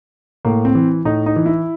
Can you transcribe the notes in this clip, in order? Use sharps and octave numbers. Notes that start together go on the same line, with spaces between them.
A2 A#3
C4
E3
A2 D#4
D#4
E3
E4